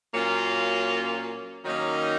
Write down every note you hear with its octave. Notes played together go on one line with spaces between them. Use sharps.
A#2 F#3 A#3 C#4 F4
D#3 F#3 A#3 C#4 D#4